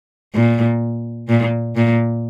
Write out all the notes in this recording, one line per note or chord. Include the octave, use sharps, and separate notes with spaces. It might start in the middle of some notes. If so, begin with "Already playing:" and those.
A#2
A#2
A#2